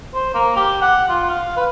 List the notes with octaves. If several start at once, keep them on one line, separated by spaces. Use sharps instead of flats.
C5
A#3
G4
F#5
F4
F5
B4